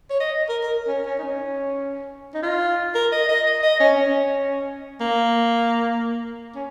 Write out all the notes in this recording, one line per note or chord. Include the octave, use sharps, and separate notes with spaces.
C#5
D#5
A#4
A#4
C#4
C#4
D#4
C#4
D#4
F4
A#4
D#5
D#5
D#5
D#5
C#4
C#4
A#3
C#4